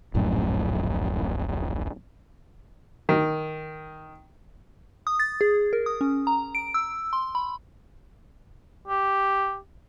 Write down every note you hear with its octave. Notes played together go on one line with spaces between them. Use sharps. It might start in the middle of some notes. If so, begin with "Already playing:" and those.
D1 A#1 F#2 A2
D#3
D#6
A6
G#4
A#4
D#6
C#4
A#5
D7
E6
C6
B5
G4